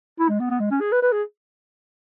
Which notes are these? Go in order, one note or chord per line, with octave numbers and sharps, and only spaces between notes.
E4
G#3
B3
B3
G#3
C#4
G#4
B4
B4
G#4